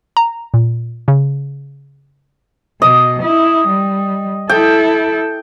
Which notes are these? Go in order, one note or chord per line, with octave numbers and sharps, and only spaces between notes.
A#5
A#2
C#3
B2 D#5
E4
G3
E4 A4 G5